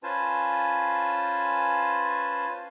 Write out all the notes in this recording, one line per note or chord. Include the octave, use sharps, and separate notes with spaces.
C#4 F4 B4 C5 G#5 A5